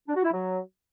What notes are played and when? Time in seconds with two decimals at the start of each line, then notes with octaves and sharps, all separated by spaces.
0.07 D4
0.15 F#4
0.23 E4
0.31 F#3